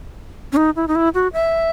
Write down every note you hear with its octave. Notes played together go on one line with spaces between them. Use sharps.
C#4
D#4
E4
D#4
E4
F#4
E5